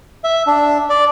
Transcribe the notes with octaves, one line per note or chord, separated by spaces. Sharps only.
E5
D4
D5